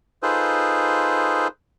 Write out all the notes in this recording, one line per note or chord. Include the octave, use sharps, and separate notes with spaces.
D#4 F4 G#4 A4 B4 C5